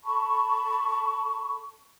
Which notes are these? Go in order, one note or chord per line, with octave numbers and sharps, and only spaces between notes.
A4 A5 B5 C#6